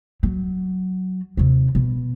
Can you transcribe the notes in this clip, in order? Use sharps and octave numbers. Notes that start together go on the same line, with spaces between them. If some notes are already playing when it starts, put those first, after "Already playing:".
F#3
D#2 C3
B2